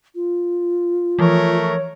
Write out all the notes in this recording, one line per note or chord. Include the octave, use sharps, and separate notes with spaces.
F4
E3 F3 A3 A#4 C#5